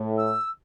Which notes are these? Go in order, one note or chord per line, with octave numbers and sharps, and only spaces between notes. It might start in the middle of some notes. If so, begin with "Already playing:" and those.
Already playing: A2
E6